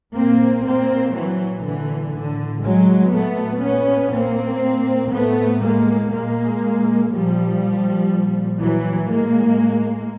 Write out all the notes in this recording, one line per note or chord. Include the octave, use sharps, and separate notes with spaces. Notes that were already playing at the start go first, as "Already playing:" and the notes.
A#2 A#3 C4
A#3 C4
A#2 E3 F#3
D3 E3
A2 D3
F#3 G#3
A#2 A3 B3
B3 C#4
A#2 A#3 C4
A2 A3 B3
G#3 A#3
A#2 G#3 A#3
A#2 F3 G3
A#2
E3 F#3
A2 G#3 A#3